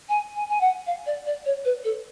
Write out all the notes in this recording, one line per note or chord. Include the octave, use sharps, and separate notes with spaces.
G#5
G#5
G#5
F#5
F5
D5
D5
C#5
B4
A4